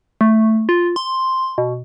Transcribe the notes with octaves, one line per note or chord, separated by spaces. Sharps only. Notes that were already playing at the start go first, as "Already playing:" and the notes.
A3
F4
C6
B2